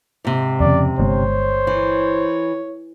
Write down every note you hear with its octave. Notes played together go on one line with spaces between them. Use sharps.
G#2 C3
F2 C#3 D5
G1 G#3 B3 C5 C#5
E3